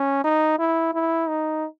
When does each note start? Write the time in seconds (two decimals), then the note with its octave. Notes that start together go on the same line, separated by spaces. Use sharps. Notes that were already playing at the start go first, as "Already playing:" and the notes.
Already playing: C#4
0.24 D#4
0.59 E4
0.94 E4
1.29 D#4